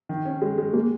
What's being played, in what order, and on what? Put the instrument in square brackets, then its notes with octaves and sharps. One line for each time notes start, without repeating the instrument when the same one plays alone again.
[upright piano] D#3
C#4
G#3
G#3
[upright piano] G#3 [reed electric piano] A#3